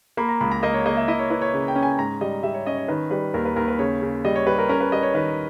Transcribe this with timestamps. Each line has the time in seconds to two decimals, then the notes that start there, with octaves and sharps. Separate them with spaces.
0.17 A#3 B5
0.29 A#5
0.41 C#2 B5
0.52 A#5
0.63 A#3 D#5
0.74 C#5
0.86 A#3 D#5
0.97 E5
1.08 E4 D#5
1.19 C#5
1.30 E4 B4
1.42 C#5
1.54 C#3
1.68 G5
1.76 C#4
1.83 G#5
1.98 G#2 A#5
2.21 G3 D#5
2.43 G3 E5
2.54 C#5
2.66 C#4 D#5
2.77 C#5
2.88 D#3 B4
3.11 G3 B4
3.34 D#2 A#4
3.45 B4
3.56 D#2 A#4
3.68 B4
3.79 C#3 C#5
4.02 C#3
4.25 G3 D#5
4.36 C#5
4.47 G3 B4
4.58 A#4
4.69 C#4 A#4
4.80 B4
4.92 G3 D#5
5.03 C#5
5.14 D#3 B4